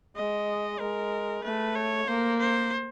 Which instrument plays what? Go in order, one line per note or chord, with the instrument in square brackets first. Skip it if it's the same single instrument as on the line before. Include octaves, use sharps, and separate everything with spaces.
[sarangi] G#3 [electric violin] D#5
[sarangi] G#3 [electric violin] A#4
[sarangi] A3 [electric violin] B4
[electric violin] C#5
[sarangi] A#3 [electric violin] C5
[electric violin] C5